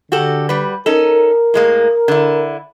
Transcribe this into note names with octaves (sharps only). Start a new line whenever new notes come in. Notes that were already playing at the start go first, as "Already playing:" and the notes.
D3 F#4 G4 A4
G3 B4
C#4 D#4 A4 A#4
A2 G#3 A#3
D3 E4